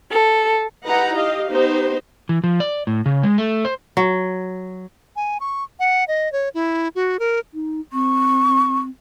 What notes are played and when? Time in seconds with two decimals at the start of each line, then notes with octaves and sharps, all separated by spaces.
0.11 A4
0.86 D#4 E4 G4 B4 F#5 A#5
1.16 G4 D#5 F5
1.50 B3 D#4 G4 C5
2.29 E3
2.44 F3
2.60 D5
2.87 A2
3.06 C#3
3.23 G#3
3.38 A3
3.65 C5
3.97 F#3
5.16 G#5
5.40 C#6
5.80 F#5
6.08 D#5
6.32 C#5
6.54 E4
6.95 F#4
7.19 A#4
7.54 D#4
7.93 C4 C#6